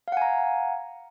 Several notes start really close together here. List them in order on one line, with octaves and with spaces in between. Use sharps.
F5 F#5 G#5 A#5